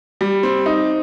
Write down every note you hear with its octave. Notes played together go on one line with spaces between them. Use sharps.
G3
C4
D#4